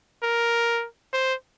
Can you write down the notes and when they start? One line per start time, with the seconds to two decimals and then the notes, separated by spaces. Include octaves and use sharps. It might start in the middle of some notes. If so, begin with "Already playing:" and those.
0.22 A#4
1.13 C5